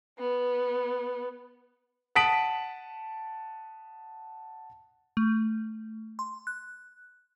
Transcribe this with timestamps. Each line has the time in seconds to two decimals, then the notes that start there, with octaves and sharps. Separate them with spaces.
0.19 B3
2.15 F#5 A5 D#6 B6 D7 F#7
5.17 A3
6.19 C6
6.47 F#6